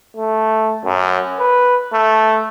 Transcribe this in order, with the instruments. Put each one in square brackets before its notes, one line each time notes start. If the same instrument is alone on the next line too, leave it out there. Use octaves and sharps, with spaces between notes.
[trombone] A3
F#2
B4
A3